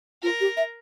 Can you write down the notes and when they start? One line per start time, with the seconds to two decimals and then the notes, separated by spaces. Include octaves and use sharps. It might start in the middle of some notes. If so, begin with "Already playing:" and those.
0.22 F4 A#4
0.40 G4
0.57 E5